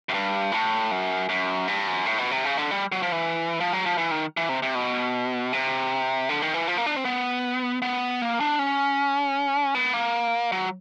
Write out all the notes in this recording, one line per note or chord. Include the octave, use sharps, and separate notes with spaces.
F#2
G2
A2
F#2
F#2
G2
F#2
A2
B2
C3
C#3
D3
G3
F#3
F3
E3
F3
F#3
F3
E3
D#3
E3
C3
C3
B2
C3
D3
D#3
E3
F3
A#3
D4
C4
B3
B3
A#3
D4
C#4
B3
A#3
F#3